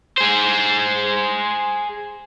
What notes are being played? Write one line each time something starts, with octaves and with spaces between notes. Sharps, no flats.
G#4 C5